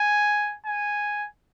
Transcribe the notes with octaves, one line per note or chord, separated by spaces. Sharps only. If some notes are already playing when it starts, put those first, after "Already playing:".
Already playing: G#5
G#5